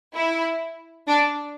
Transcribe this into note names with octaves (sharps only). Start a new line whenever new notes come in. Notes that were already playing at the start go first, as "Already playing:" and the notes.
E4
D4